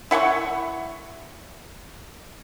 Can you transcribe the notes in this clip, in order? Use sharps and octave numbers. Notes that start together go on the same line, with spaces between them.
E4 F#5 G5 C#6